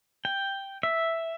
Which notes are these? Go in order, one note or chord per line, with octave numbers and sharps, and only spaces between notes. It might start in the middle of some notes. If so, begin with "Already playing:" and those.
G5
E5